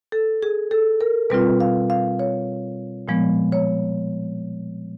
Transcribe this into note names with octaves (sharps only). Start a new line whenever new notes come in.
A4
G#4
A4
A#4
B2 G3 C4 F4 B4
F5
F5
C#5
A#2 F3 G#3 B3
C#5